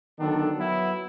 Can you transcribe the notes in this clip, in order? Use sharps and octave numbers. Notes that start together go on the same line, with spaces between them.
D3 D#3 F#3 B3 D4 A4
F#3 B3 E4